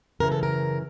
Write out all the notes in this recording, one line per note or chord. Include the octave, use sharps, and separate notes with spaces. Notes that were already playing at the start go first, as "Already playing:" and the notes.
F#2 C#3 E3 A#4
A4
A#4